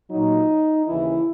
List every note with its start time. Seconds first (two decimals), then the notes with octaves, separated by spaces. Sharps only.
0.10 A#2 F#3 D#4
0.87 D#2 C#3 E3 E4